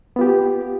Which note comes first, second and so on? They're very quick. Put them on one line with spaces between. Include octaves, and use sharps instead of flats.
B3 F4 G4